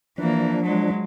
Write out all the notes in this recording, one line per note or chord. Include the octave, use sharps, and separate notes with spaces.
E3 F3 A#3 D4
F#3 G#3